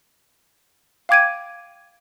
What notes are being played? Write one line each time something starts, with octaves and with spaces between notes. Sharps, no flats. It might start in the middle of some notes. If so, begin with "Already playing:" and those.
F5 G5 D6 G#6 D7 D#7